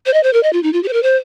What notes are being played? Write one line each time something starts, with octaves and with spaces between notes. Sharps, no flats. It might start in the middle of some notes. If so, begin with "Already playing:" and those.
C5
D#5
C5
A#4
D#5
F4
D#4
F4
G4
C5
A#4
C5